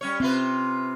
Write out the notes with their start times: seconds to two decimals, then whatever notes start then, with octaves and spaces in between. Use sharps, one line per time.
0.01 G3 C#4 C#5
0.20 C3 C4 F4 B4